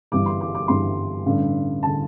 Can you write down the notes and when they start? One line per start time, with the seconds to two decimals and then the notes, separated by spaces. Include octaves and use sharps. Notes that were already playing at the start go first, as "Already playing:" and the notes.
0.12 G1 G2 E3 G3 D6
0.26 C6
0.41 D6
0.55 D6
0.68 G1 G2 E3 G3 C6
1.26 A1 G2 D3
1.83 D3 A5